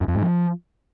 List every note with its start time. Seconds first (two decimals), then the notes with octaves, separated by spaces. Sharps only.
0.01 F#2
0.08 F2
0.15 G#2
0.22 F3